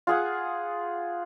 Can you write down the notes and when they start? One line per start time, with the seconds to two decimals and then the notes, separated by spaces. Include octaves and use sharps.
0.07 F4 G#4 F#5